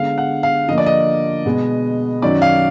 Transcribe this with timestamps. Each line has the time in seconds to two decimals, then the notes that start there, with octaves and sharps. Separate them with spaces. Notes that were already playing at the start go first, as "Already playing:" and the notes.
Already playing: D3 G#3 B3 F5
0.18 F#5
0.43 F5
0.68 D3 F3 A#3 D#5
0.78 D5
0.86 D#5
1.46 B2 G#3 B3
2.22 F#2 D#3 F#3 D5
2.42 F5